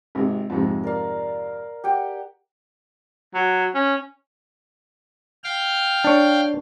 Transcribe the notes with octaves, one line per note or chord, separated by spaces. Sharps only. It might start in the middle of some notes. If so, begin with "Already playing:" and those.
G#1 C3
F2 G#2 C3
A#4 D5 F5
G4 F#5 G5
F#3
C#4
F5 G5 F6
D4 C#5